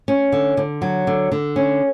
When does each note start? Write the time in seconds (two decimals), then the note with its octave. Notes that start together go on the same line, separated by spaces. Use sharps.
0.08 C#4
0.32 D3
0.57 D3
0.82 F#3
1.07 D3
1.32 D3
1.56 C#4